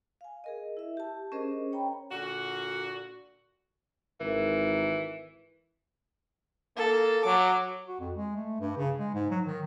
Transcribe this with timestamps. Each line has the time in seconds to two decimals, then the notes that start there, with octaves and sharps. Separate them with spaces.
0.21 F5 G#5
0.44 G#4 A#4 D#5
0.77 E4 E5
0.97 G4 A5
1.32 C#4 D4 G#4 A#4 C5 D#5
1.72 C#5 G5 A#5 B5
2.11 A#2 D3 F#4
4.20 G#1 E3 A#4
6.77 A#3 A4
7.25 F#3 D6
7.87 F#4
8.00 F2
8.15 G#3
8.36 A3
8.60 G2
8.77 C#3
8.98 G#3
9.14 G#2
9.30 F#3
9.46 D#3